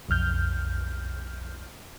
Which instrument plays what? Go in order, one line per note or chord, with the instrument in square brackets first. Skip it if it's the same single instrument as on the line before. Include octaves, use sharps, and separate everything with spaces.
[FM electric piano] B1 F2 F6 G6